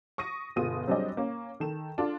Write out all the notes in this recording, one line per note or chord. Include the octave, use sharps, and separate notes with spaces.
C#6 D#6 A#6 D#7
G1 B2 G#3 F4 D#6 D#7
F#3 G3 C4 D4 G#4 D#5
A#3 C#4
D#3 A4 E7
D4 F4 A4